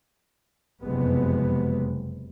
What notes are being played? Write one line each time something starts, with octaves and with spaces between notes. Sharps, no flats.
F#1 F2 C3 G#3 B3